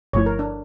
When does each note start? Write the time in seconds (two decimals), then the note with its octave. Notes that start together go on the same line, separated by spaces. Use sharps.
0.13 G1 G2 F3 A3 E4 C#5
0.26 A#4
0.39 D4